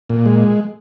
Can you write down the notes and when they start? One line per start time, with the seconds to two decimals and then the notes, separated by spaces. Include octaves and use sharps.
0.09 A#2
0.26 G#3